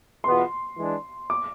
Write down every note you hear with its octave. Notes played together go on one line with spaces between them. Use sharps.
E2 B2 B3 F4 C6
E3 G#3 D4
D6